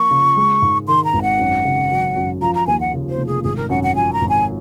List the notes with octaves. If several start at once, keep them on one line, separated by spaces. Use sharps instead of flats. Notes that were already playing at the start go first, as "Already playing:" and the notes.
Already playing: F3 A#3 C#6
C#3
G#3
G#2
D#3 C6
A#5
G#1
F#5
F#2
C#3
F#3
F#2
F3 A#5
A#5
D#2 G#5
F#5
C#3
C5
F1
G#4
G#1 G#4
A#4
F#2 F#5
F#5
F3 G#5
A#5
G#1
G#5